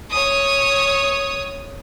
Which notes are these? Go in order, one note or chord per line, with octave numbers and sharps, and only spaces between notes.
C#5 D#6